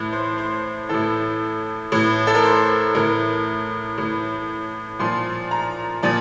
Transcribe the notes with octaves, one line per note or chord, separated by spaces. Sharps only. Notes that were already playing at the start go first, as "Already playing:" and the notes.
Already playing: A2 E3
C5
C5
A2 E3 A4
A2 E3
A4
A#4
C5
A2 E3 A#4
A2 E3
A#2 F3 C6
A#5
A#2 F3 D5